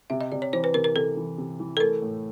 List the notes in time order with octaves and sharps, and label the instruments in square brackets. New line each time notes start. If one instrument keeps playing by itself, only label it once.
[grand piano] C3 [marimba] E5
[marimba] D#5
[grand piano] C3 [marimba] D5
[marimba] C#5
[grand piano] E3 [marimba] C5
[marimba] B4
[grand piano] C3 [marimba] A#4
[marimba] A#4
[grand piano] C3 [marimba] A4
[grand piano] E3
C3
E3
[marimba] A4
[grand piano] A3 [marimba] A#4
[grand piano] A2